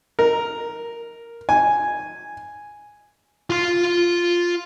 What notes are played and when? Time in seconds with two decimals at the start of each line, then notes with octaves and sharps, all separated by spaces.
0.19 A#4
1.49 G#5
3.50 F4 C6